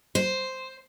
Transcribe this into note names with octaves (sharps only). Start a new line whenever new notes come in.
C5